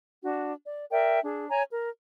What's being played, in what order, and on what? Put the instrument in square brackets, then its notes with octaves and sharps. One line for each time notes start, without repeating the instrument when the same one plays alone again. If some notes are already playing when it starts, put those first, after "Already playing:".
[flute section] D4 F#4
D5
A#4 D5 E5 G5
D4 G#4
C#5 G#5 A#5
A#4